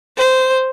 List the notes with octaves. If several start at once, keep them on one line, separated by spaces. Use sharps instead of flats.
C5